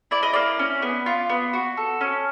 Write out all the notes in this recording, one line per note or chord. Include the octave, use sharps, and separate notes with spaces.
E4 D5
D#5
A#3 D5
C#4
B3
F4
B3
F#4
A4
C#4